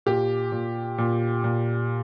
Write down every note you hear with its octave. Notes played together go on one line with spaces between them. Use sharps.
A#2 G4
A#2
A#2
A#2